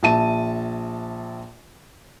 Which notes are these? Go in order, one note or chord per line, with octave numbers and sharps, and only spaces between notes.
A#1 E5 A5 D#7